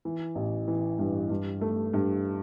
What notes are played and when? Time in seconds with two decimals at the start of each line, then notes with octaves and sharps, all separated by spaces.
0.05 E3
0.35 A1
0.68 E3
0.99 G2
1.30 G2
1.61 A3
1.94 G2